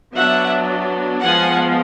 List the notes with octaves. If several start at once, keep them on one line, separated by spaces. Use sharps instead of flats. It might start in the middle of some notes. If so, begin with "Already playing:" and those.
F#3 B3 D4 E5 F#5
F3 G#3 B3 F#5 G#5